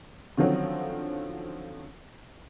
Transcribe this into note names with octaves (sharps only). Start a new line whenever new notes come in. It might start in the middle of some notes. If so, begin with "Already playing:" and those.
D3 D#3 F3 F#3 C4 C#4